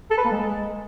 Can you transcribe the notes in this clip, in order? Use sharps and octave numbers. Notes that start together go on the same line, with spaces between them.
A4
B4
A#3
G#3